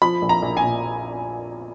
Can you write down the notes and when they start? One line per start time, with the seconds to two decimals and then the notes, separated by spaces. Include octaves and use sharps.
0.02 F3 B5
0.22 A#1
0.29 A#5
0.42 A#1
0.57 G#5
0.63 A#2